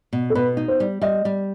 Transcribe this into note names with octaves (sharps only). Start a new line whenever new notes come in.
B2
A4
B2 B4
D#4
C5
G3
G3 D#5
G3